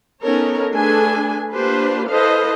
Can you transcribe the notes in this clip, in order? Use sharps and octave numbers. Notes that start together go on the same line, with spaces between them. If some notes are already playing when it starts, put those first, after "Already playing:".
B3 C#4 D#4 A4 A#4 C#5
A3 D4 G#4 A4 B4 G#5
A#3 D4 F4 G4 B4 C5
E4 A4 B4 C5 D#5 F5